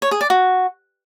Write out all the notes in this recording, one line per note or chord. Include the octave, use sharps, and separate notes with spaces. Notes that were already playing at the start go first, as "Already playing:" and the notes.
C#5
G#4
D5
F#4